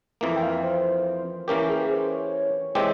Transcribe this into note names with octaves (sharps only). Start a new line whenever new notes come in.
F2 E3 A#3
G5
F5
C5
E3 A#3 C#4 G4 A#4
G#4
C5
C#5
E3 G#3 C4 G4